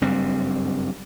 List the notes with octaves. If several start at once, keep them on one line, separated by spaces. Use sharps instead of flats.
F#1 G2 G3 C4